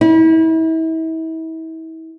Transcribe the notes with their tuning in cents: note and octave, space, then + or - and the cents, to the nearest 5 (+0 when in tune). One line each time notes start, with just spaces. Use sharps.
E4 -35